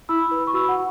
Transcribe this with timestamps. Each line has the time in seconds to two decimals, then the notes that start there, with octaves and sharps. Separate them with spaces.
0.09 E4 B5 E6
0.31 B4
0.47 C#6
0.54 F#4 B5 E6
0.69 F#5